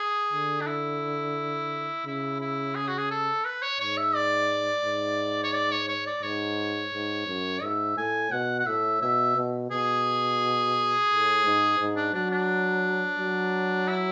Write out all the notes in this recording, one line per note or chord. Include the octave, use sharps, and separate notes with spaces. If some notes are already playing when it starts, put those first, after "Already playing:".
Already playing: G#4
D3
D4
E4
C#3 E4
E4
G#4
F#4
G#4
A4
B4
C#5
G#2 C#5
E5
D5
G#2
C#5
D5
C#5
C#5
D5
G#2 C#5
G#2
F#2
G#2 E5
A2 G#5
B2 F#5
F#5
A2 E5
B2 E5
B2
B2 G#4
A2
G#2
G#2
D4
F#3 D4
D4
F#3
E4